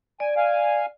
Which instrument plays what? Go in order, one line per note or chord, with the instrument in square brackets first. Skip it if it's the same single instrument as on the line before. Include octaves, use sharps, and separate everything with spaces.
[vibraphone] D5 [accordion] G#5
[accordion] F5 G#5